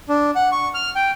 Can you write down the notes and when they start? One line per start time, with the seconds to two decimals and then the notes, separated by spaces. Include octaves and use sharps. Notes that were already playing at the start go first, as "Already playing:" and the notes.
0.09 D4
0.35 F#5
0.52 C#6
0.74 F6
0.95 G5